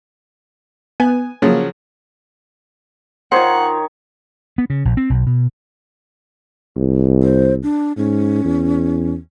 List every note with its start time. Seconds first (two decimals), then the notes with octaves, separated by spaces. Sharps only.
1.00 B3 G#5
1.42 C#3 F3 F#3 A#3
3.32 D#3 F4 C5 C#5 F#5
4.58 B3
4.70 C#3
4.85 A#1
4.97 C4
5.10 B1
5.27 B2
6.77 C2
7.23 C5
7.63 D4
7.97 G#2 C#4
8.45 E2